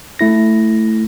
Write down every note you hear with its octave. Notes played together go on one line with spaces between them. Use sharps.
A3 E4 A#6